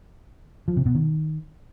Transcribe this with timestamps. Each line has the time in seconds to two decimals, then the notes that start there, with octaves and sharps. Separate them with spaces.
0.68 F3
0.77 C3
0.86 B2
0.95 D#3